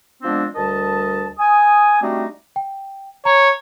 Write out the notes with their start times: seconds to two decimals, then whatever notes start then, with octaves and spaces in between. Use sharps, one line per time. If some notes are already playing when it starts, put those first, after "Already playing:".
0.23 F3 G#3 B3 C4 D4
0.56 D2 G3 A#4 D#5 A5
1.39 G#5 D#6
2.02 G3 A3 C4 D4 D#4 F#4
2.56 G5
3.25 C#5 A#5